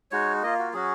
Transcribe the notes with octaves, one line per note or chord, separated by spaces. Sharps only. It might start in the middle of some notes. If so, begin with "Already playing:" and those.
G#3 D#4 F#4 C#5
A#3 F4 D#5
F#4
F#3 C#4 F#4 G#4